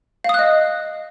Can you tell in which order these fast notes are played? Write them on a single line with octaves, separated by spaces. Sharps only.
F5 D#6 F#6 D#5